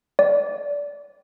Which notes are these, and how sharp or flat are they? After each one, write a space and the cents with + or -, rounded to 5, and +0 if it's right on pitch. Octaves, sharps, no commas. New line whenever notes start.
D5 -20